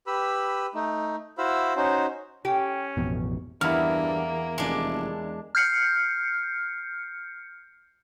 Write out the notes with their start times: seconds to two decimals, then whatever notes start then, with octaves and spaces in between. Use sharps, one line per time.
0.07 G4 B4 B5 E6
0.75 A3 D#4
1.38 E4 F#4 C5 F5 B5 E6
1.76 C#4 D#4 F#4 C5
2.45 C#4 G4
2.97 A1 F2 B2
3.61 E2 G2 A#3 E4 F6
4.58 F1 G#3 D4
5.55 F6 G6 C7 C#7